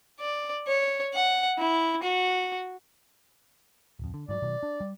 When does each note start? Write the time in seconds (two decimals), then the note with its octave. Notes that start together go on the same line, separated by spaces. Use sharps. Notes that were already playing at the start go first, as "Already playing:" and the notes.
0.21 D5
0.68 C#5
1.14 F#5
1.58 E4
2.03 F#4
3.99 D1 F2
4.14 D3
4.29 G#2 F3 F#3 D5
4.42 B2 D#3 F#3
4.63 D4
4.81 G3